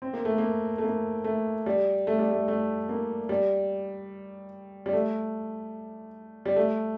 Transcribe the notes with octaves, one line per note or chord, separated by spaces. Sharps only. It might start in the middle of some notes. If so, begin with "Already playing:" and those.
C4
A#3
A3
A#3
A3
A#3
A3
G3
A3
G3
A3
A3
A#3
G3
G3
A3
G3
A3